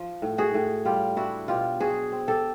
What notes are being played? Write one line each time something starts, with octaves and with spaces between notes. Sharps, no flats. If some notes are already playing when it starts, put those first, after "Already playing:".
Already playing: F3
A2
F#4 G#4
A2
G3 F4 G4
D4 E4 F#4
B2 F4 G4
F#3 F#4 G#4
C4
G4 A4